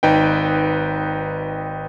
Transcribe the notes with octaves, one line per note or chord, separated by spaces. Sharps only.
G#1 D#4 B4 G5